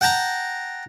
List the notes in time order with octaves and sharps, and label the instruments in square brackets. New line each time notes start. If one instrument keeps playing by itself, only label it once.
[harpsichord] F#5 G5 A5 A#5